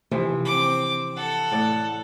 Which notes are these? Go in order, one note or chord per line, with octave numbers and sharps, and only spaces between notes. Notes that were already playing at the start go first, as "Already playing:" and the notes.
C3 E3 F3
C4 D6
A4 F#5
A2 D5